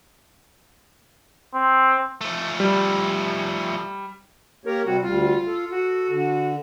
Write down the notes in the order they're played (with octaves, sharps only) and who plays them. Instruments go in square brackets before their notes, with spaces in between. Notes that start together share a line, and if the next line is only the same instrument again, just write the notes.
[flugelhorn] C4
[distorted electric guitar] F3 A3
[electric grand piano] G3
[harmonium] A#3 G4 C#5 [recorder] A#4
[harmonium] C3 G3 C4 [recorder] F#4
[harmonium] D2 G3 [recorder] F4
[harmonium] A4
[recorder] F#4
[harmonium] D3